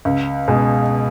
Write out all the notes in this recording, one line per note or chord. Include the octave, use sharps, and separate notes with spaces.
C#2
B2 G#3